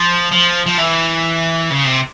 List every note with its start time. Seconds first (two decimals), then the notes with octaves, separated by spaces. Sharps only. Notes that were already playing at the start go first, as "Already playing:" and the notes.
Already playing: F3
0.32 F3
0.66 F3
0.78 E3
1.70 C#3
1.85 C3